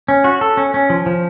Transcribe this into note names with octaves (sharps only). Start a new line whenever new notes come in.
C#4
F#4
A4
C#4
C#4
F3
F3